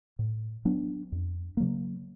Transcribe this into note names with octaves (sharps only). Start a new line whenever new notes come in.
A2
F#3 B3 D4
F2
C#3 F#3 A#3